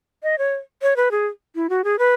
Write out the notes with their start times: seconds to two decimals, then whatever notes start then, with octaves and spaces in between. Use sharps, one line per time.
0.23 D#5
0.38 C#5
0.82 C#5
0.96 B4
1.11 G#4
1.55 E4
1.69 F#4
1.84 G#4
1.99 B4